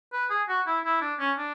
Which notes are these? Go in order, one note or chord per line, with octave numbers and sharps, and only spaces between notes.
B4
G#4
F#4
E4
E4
D4
C#4
D4